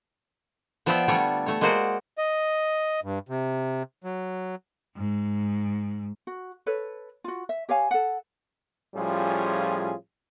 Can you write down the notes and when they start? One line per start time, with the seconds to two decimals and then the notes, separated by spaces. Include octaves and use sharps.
0.86 F3 B3 F4 D5 E5 G5
1.08 D3 G3 A3 D4 C#5
1.46 A3 C#5
1.61 G#3 A#3 F#4 C5 D5 F#5
2.18 D#5
3.04 G2
3.29 C3
4.04 F#3
4.97 G#2
6.27 F#4
6.66 A4 B4 C#5
7.24 F4 F#4
7.49 E5
7.69 G4 C#5 F5 G#5
7.91 A4 F#5
8.94 A2 F3 G3 C#4 F4 G#4